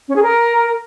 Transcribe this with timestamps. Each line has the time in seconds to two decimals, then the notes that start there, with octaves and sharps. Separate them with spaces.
0.08 C#4
0.15 G#4
0.22 A#4